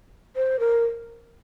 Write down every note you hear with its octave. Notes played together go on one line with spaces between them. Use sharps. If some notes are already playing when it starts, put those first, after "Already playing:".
C5
A#4